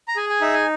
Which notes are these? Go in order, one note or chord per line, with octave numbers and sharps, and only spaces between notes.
A#5
G#4 G#5
G#5
D#4 E5
G#5